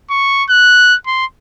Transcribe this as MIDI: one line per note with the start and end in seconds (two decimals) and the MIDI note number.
0.10 0.44 85
0.49 0.96 90
1.07 1.26 84